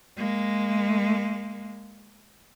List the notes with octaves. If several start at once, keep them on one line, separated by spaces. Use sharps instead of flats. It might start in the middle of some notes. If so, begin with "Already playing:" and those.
G#3 A#3